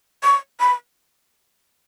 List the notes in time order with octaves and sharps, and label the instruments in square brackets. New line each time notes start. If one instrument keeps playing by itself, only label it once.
[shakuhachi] C#6
B5